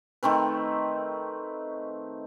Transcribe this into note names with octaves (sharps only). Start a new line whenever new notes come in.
D#3 A3 C4 B4